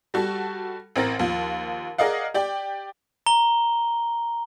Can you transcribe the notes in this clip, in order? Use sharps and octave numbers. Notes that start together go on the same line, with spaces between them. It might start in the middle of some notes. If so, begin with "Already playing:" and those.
G3 F#4 A4
A1 C4 A#4 A6
D#2 F3
G#4 A#4 D5 D#5 F5 F#5
G4 D5 G5
A#5 G7